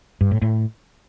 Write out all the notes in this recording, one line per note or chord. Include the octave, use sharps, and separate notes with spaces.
G2
A2
A2